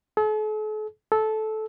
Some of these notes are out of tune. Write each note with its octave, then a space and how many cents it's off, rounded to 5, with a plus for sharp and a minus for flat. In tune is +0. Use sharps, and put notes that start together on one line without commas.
A4 -45
A4 -15